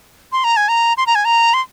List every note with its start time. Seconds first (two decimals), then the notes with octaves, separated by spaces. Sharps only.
0.32 C6
0.44 A#5
0.57 G#5
0.69 A#5
0.97 C6
1.07 A#5
1.15 G#5
1.25 A#5
1.54 C6